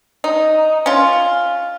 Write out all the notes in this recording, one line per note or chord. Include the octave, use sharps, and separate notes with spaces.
D#4
C#4 F4